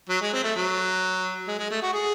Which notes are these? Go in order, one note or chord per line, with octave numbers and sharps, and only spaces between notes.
F#3
G#3
C4
A3
F#3
G#3
G#3
A3
F#4
G#4